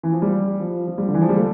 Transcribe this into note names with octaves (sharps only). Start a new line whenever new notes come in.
E3
F3
G3
F3
F3
G3
D3
E3
F3
G3
A3